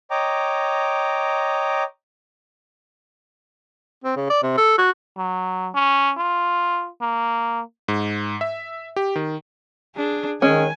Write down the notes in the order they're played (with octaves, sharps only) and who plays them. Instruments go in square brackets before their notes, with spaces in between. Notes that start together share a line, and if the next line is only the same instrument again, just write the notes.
[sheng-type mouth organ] C#5 D#5 G5 A#5 D6
[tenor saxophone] C4
C#3
D5
C3
A4
F#4
[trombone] F#3
C#4
F4
A#3
[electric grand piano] G#2
E5
G4
D#3
[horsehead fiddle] D4 G#4
[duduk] D#3 [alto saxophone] G#3 [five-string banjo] C#4 [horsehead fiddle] G#5